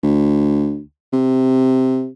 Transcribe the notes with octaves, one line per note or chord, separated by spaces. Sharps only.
D2
C3